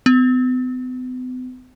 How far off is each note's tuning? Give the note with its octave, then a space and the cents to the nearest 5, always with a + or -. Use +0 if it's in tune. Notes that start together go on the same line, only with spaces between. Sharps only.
B3 +45